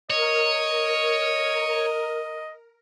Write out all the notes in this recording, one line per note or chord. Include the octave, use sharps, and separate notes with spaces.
A#4 C#5 D#5